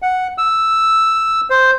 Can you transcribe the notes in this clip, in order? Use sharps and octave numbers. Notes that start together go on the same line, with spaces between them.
F#5
E6
C5